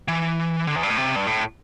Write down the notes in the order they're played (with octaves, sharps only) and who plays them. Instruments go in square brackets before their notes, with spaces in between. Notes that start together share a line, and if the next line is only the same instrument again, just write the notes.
[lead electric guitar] E3
D3
E2
G2
A2
C3
G2
A2